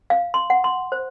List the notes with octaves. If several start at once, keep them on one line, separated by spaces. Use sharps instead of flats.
F5
C6
F#5
C6
C5